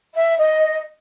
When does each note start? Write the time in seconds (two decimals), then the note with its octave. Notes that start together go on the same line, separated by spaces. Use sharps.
0.14 E5
0.37 D#5